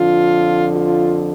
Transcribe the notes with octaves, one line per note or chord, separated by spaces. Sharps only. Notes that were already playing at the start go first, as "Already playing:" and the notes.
Already playing: F2 D3 F3 F4
F4